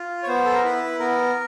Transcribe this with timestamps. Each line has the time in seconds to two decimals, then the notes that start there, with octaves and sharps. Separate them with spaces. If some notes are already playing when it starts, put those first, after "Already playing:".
Already playing: F4
0.23 C#5
0.28 B3 C5
0.45 A4
0.54 A#4
0.64 E4 B4
0.99 B3 A#4